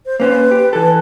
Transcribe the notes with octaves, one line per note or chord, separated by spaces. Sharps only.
C5
A#3 C#4 B4 C5
G4
E3 A4 B4